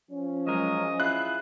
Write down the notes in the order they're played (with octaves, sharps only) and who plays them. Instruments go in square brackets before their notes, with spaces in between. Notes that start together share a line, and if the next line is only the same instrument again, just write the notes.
[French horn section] F3 C#4
[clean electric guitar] F#3 G#3 A#4 [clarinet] D#5
[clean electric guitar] E4 F4 G#4 [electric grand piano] F#6